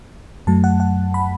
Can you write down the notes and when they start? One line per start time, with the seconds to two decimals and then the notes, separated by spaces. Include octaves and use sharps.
0.47 F#2 F#3 A3 A5
0.64 F#5
0.80 F#5
1.14 B5